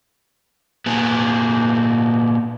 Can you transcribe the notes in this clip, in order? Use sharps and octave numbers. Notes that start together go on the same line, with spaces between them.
A#2 B3 G#4